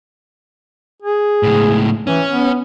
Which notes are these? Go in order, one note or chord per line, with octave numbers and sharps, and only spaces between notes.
G#4
C#2 A2
E3 C#4
B3